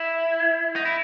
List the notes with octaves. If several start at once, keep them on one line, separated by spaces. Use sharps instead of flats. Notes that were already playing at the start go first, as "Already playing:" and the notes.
Already playing: E4
D#4
E4